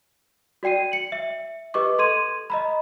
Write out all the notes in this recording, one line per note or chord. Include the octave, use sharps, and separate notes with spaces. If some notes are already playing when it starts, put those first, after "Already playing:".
F#4 D5 G5 C7 D#7
C#7 F#7
E5
G4 B4 D#5 C#6 D6
A4 C6 G#6 D#7
D#5 A#5 B5